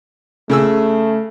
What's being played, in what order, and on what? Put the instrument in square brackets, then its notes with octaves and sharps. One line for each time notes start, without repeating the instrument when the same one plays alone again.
[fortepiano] C#3 G#4 E6 [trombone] A3